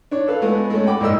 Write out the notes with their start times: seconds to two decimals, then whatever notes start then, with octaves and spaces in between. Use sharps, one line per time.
0.11 D4 C#5
0.28 A4 B4 F5
0.42 G#3 A3 B3
0.70 G#3 A3 C#4
0.86 F#5 G5 B5 D6
1.00 B1 G#2 A#3 D5 D#5 E6